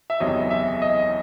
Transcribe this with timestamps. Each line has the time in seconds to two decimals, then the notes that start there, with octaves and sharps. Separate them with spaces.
0.10 E5
0.20 F#1 E2 C3 D#3 F#3 D#5
0.50 E5
0.82 D#5